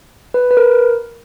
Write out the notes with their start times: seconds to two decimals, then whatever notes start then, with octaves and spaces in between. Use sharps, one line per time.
0.34 B4
0.51 B4
0.57 A#4